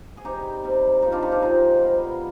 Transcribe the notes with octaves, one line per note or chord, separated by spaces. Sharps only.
G#4
C3 G3 C4 D#4 G4
C3 G3 C4
C3 F3 G#3 D#4
D4 F4
D#4 G4
D4 F4
C3 F3 G#3 D#4
G#2 D#3 G3 B3